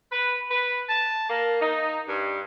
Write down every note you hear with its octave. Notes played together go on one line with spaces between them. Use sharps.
B4
B4
A5
A#3
D#4
G2